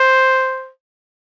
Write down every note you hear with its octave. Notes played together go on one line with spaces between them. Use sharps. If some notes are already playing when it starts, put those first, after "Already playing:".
Already playing: C5